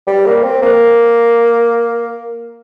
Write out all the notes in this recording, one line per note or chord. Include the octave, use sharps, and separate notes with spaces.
G3
A#3
C4
A#3